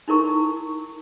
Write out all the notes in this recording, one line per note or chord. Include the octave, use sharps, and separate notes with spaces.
D#4 E4 A#4 C#6